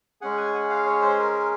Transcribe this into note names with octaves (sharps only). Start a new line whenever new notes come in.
G#3 C#4 G#4 F#5
G#5
F#5
F5
C#5
C5
A#4
A#4